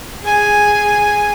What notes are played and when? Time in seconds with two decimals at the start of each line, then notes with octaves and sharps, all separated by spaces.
0.22 G#4 G#5